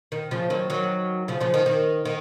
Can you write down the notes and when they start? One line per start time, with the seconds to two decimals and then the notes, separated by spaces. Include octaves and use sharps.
0.12 D#3
0.31 C#3 F3
0.50 D#3 F#3
0.70 D#3 F#3
1.28 C#3 F3
1.41 C#3 F3
1.54 D#3
1.66 D#3
2.05 D#3